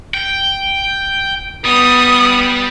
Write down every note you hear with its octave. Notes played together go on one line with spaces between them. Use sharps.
G5
G3 B3 D#6